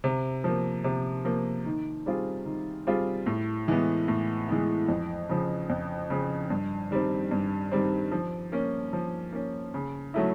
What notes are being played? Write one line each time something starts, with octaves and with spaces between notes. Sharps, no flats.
C3
F3 A#3
C3
F3 A#3
D#3
G3 C4 F4 G#4
D#3
G3 C4 F4 G#4
A2
E3 G#3 B3
A2
E3 G#3 B3
F2
C#3 F3
F2
C#3 F3
G2
D#3 G3 C4
G2
D#3 G3 C4
F3
A#3 C#4
F3
A#3 C#4
C#3
F#3 A3 C#4 E4